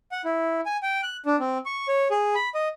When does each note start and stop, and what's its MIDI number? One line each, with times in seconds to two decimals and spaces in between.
0.12 0.21 78
0.25 0.61 64
0.66 0.77 80
0.83 1.01 79
1.03 1.17 90
1.26 1.36 62
1.40 1.58 60
1.66 1.87 85
1.88 2.08 73
2.11 2.35 68
2.35 2.49 83
2.55 2.68 75